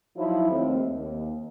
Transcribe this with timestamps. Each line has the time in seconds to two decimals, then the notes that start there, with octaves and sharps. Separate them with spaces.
0.16 F3 F#3 D#4 E4
0.49 D#2 A3 C4
0.91 D#2